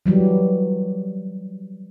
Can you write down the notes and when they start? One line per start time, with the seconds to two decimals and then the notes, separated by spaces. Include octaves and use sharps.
0.06 E3 F#3 G3